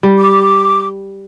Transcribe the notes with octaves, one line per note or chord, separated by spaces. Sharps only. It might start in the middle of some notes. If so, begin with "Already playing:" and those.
G3
D6